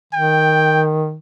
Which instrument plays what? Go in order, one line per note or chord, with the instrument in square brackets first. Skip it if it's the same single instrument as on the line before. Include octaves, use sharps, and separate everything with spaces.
[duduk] D#3 [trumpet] G5